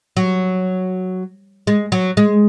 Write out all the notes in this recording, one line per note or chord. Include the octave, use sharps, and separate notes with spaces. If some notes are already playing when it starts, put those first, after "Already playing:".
F#3
G#3
F#3
G#3